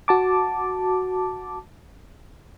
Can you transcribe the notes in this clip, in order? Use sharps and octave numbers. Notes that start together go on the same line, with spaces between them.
F#4 A5 D6